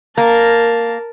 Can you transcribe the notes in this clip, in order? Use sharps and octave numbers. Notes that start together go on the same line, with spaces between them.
A#3 A#4 A5